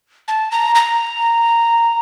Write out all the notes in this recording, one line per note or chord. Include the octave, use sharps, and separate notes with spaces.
A5
A#5
A#5